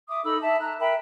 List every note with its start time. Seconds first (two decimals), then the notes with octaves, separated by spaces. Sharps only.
0.09 E5 D6 D#6
0.25 D#4 A4 B5 E6
0.41 E5 A5
0.61 A#5 F#6
0.80 A#4 E5 G5 B5